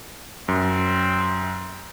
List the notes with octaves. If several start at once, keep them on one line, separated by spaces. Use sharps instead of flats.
F#2 C4